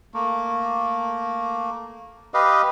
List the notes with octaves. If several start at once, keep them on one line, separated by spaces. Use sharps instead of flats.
A3 A#3
G4 B4 D#5 F5